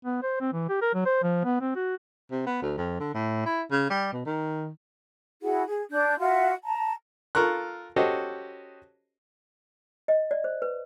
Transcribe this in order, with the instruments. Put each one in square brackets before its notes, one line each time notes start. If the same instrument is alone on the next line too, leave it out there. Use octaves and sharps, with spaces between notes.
[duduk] B3
C5
C4
E3
G4
A#4
F#3
C5
F3
B3
C4
F#4
[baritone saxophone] C3
B3
D2
F2
D3
A2
E4
C#3
G3
B2
D#3
[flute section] E4 F#4 G#4 F#5
G#4
D4 G6
F4 F#4 E5 F#5
A5 A#5
[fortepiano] F4 A4 A#4 C#6 F#6
C#4 F#4 G4 A4 C5 D#5
[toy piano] D#5
D5
C5
B4